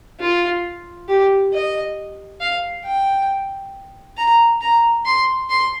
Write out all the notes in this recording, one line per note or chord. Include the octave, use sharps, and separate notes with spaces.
F4
G4
D#5
F5
G5
A#5
A#5
C6
C6